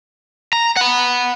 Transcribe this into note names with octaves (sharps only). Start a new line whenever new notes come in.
A#5
F#5 B5